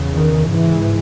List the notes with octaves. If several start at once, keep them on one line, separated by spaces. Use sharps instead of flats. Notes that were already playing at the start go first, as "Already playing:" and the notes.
Already playing: E2 C#3
D#3
G#2 E3